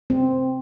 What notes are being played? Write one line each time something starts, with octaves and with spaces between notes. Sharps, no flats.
C4